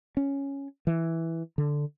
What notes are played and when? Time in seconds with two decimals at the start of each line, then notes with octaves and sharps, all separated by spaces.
0.17 C#4
0.87 E3
1.58 D3